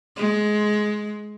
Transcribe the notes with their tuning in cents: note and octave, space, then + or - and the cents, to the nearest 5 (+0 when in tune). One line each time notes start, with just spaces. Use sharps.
G#3 +15